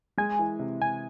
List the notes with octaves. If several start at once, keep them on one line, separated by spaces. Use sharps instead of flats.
G#3 G#5
E3
C3
C3 G#5